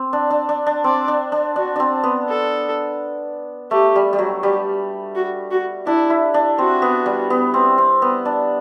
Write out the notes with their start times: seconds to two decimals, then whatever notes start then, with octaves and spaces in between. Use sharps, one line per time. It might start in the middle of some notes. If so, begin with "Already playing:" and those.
Already playing: C4
0.13 D4
0.30 D4
0.49 D4
0.66 D4
0.84 C4 D5
1.08 D4
1.32 D4
1.56 D4 F#4
1.76 C4 D4
2.03 B3
2.28 A4
3.71 A3 G4
3.96 G3
4.13 G3
4.19 F#3
4.43 G3 G4
5.15 F#4
5.51 F#4
5.86 D4 E4
6.10 E4
6.34 D4
6.58 C4 F#4
6.82 B3
7.06 G3
7.30 B3
7.54 C4
7.78 C4
8.02 B3
8.25 D4